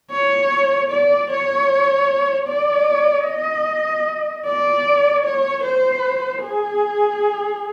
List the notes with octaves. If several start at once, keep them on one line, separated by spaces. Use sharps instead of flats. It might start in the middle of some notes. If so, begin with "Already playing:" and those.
C#5
D5
C#5
D5
D#5
D5
C#5
C5
G#4